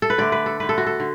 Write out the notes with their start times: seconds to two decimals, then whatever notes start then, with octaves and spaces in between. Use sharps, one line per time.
0.02 A4
0.10 B4
0.18 D3 A3 D5
0.32 B4
0.46 A4
0.60 D3 A3 B4
0.69 A4
0.78 F#4
0.87 A4
1.00 D3